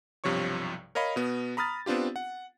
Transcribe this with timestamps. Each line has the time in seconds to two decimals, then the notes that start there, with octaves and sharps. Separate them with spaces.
0.24 B1 G2 C3 F3 C#5 C#6
0.95 A#4 C#5 D#5 F5 B5
1.16 B2 B3
1.57 A#5 B5 D#6 F6 A6
1.86 B3 C4 D4 F4 G4
2.16 F#5